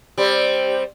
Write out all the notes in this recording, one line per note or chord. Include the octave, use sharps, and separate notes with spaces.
G3 C4